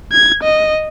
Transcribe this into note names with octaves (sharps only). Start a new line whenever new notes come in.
G#6
D#5